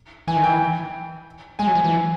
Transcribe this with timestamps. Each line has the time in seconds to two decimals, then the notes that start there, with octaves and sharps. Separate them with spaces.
0.27 E3 G#5
0.36 D#3
0.44 E3 G5
1.59 G#3 G#5
1.67 F#3
1.75 F3
1.84 E3